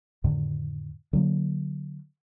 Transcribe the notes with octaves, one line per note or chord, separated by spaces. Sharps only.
F2 A2 D3 D#3
D3 F#3 A#3